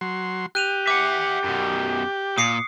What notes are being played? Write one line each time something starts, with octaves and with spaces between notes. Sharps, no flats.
F#3 C6
G4 F#6 D#7 F7
E5 F#5 D6
F#2 B2
A#2 D#6 C7 C#7